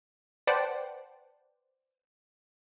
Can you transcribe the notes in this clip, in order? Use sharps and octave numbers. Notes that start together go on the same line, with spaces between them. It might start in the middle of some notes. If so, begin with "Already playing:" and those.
B4 C5 D5 F#5 G5 A5